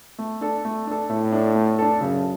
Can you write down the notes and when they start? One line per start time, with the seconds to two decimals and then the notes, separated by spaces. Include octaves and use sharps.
0.19 A3
0.41 D4 A4
0.65 A3
0.87 D4 A4
1.10 A2 A3
1.33 D4 A4
1.55 A3
1.79 D4 A4
2.01 F#2 C#3